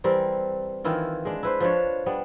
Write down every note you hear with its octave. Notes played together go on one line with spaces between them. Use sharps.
E3 G3 C4 A#4
D#3 E3 E4 F4
G#3 D4
E4 B4 C5
F3 D4 C#5
G3 B3 D4